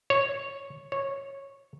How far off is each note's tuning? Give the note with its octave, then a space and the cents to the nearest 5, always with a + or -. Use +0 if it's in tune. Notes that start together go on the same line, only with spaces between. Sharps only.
C#5 -5
C#5 -10